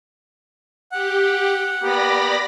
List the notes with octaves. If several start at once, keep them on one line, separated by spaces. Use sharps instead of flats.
G4 F#5
A#3 B3 G4 D5 B5 A#6